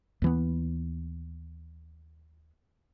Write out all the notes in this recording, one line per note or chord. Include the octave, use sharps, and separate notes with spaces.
D#2 E3 B3